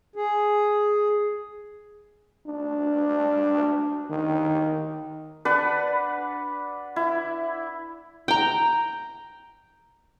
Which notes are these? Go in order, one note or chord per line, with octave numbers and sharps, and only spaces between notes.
G#4
D4
D#3
D4 B4 F#5
E4
G5 A#5